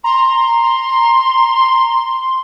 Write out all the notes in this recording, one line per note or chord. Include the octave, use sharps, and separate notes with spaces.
A#5 C6
A#5